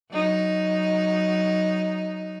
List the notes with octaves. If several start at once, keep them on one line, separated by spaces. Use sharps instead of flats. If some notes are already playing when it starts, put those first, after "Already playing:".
F#3 D#4